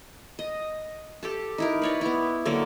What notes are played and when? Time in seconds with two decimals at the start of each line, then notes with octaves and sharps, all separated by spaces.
0.39 D#5
1.23 G4 A4 A5
1.58 D#4 E4 A#4
1.82 B4 C#5 D5
2.01 B3 E4
2.45 D3 F#3 A#3